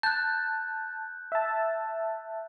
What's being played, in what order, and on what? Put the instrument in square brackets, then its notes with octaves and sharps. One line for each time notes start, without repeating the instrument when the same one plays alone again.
[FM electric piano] A5 [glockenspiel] F#6 G6
[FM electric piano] E5 A5